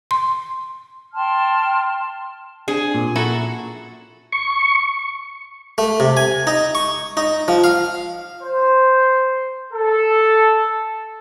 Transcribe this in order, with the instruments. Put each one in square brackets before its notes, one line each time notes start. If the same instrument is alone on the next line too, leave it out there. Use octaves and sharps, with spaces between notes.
[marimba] C6
[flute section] G5 A5 C6 F6
[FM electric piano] C4 D4 [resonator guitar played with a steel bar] G#4
[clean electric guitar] A#2
[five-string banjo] E4 F#4 A4 [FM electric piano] A#5
[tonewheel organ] C#6
[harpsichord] A3
C3
G#5
D#4
C#6
D#4
F3
F5
[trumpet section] C5
A4